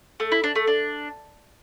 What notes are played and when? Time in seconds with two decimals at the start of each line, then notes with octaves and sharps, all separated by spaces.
0.20 A3
0.32 E4
0.44 D4
0.56 A3
0.67 D4